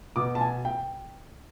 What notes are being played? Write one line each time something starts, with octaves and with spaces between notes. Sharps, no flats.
B2 D6
A5
G#5
G5